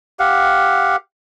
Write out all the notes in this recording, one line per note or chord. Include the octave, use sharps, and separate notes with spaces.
G4 F5 F#5